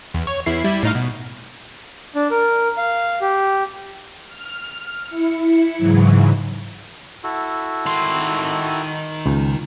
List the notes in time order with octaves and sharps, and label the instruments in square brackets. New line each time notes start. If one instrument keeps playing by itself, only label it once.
[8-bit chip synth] E2
C#5
E2 E4 C7
G3 E4
A2 D#4 F5
B2
[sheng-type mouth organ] D4
A#4
F5
G4
[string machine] F6
E4 C#7
G#2 C#3 E3 F#3
[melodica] E4 F#4 A4
[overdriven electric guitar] D#3 C6
[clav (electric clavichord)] C#2